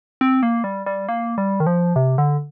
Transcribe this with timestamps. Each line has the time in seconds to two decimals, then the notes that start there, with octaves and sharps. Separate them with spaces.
0.21 C4
0.43 A#3
0.64 G3
0.86 G3
1.09 A#3
1.38 G3
1.60 D#3
1.66 F3
1.96 C3
2.18 D3